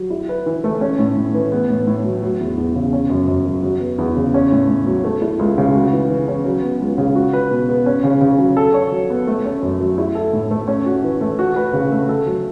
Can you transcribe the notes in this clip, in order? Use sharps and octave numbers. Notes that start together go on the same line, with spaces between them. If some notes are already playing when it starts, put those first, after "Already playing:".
Already playing: F#3
E4
B4
E3
A3
C#4
A2
A2
E3
B3
A2
A2
F#3
F#3
E2
E2
C#3
C#4
F#2
F#2
F#3
F#3
B3
E2
C#3
C#4
A2
A2
F#3
A3
E4
C#2
C#3
F#4
E3
E3
C#4
F#3
B3
C#2
C#3
F#4
B4
B2
B3
C#4
C#3
C#3
F#3
A4
C#5
F#3
B3
A3
C#4
F#2
F#3
E4
A4
A2
A3
C#4
F#4
E3
A3
F#4
B4
C#3
A3
A4
F#3